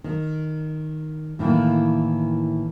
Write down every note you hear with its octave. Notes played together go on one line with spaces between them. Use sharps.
D#3
A2 D#3 E3 A#3